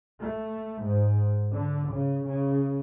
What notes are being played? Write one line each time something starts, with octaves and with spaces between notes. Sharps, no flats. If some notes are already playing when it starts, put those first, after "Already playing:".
A3
G#2
D3
C#3
C#3